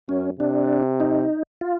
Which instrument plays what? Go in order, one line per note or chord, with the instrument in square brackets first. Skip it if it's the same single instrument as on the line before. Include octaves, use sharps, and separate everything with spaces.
[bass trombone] F#2 [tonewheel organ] C#4
[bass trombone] C3 [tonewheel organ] D4
[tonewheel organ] D#4
F4